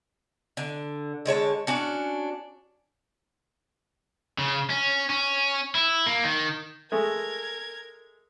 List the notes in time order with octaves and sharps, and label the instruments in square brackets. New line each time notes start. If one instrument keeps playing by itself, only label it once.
[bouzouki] D3
D3 G#3 C#5 A5
C#4 D4 F#4
[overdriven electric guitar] C#3
C#4
C#4
E4
A#3
D#3
[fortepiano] G#3 A3 G#4 [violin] A#4 G#6